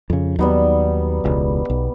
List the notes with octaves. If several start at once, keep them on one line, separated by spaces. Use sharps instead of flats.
F2 C#3
D#2 F#3 G3 B3 D#4
E1 C#2
B1